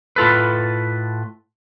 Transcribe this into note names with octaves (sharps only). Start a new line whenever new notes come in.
A2 F4 A4 B4